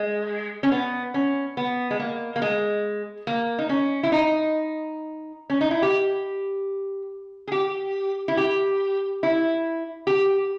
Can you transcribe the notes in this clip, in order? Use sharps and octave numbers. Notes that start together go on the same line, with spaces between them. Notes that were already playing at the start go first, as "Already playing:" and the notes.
Already playing: G#3
C#4
B3
C#4
B3
G#3
A#3
A#3
G#3
A#3
D#4
C#4
E4
D#4
C#4
D#4
E4
G4
G#4
G4
E4
G4
E4
G4